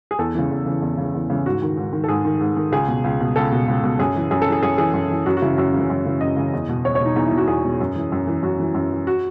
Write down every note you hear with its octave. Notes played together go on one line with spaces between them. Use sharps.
G#4
E2 A4
C#3 E3
E2
C#3 E3
E2
C#3 E3
E2
C#3 E3
G#2 F#4
D#3
G#2
D#3
A4
G#2 G#4
D#3
G#2
D#3
C#2 G#4
B2
C#2
B2
C#2 A4
B2
C#2
B2
F#2 G#4
E3
F#2 G#4
A4
E3 G#4
F#2 G#4
E3 G#4
F#2
E3
F#2 F#4
F#4
C#3 E3 E4
F#2 F#4
C#3
E3
F#2
C#3 E3
F#2 D#5
C#3 E3
E2
B2
E2 C#5
C#5
B2 D#4
E2 D#4
E4
B2
F#4
E2 G#4
B2
F#2
E3
F#2
E3
F#2 F#4
E3
F#2
E3
F#4